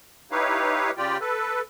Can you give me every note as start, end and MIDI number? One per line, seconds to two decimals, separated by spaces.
0.31 0.91 63
0.31 0.91 64
0.31 0.91 67
0.31 0.91 71
0.31 0.91 73
0.31 0.91 77
0.97 1.18 49
0.97 1.18 65
0.97 1.18 67
0.97 1.18 74
0.97 1.18 79
1.21 1.61 69
1.21 1.61 71